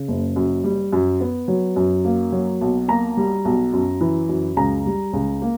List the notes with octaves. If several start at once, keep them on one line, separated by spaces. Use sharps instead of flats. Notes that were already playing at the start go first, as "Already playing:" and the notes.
Already playing: C#3
F#1
F#2
G3
F#2
B3
F#3
F#2
A#3
F#3
B1
A#3 A#5
G3
B1
F#2
E3
F#2
C#2 A#5
G3
C#2
A#3